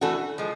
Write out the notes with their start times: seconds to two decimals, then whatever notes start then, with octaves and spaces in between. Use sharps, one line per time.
0.01 E3 A3 D4 F#4 A4
0.38 F3 G#3